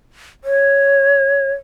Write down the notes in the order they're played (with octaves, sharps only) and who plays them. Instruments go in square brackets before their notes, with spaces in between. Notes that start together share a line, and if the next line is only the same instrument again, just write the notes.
[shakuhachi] C#5